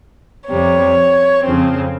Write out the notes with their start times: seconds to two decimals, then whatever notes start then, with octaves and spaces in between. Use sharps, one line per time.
0.49 F2 C3 G3 C#5
1.44 F2 C#3 F3 C4